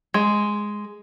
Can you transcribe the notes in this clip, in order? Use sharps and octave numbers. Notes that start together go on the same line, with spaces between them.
G#3